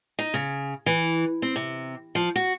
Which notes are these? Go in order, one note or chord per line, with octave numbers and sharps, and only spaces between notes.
D#4
C#3
E3
C4
C3
F3
F#4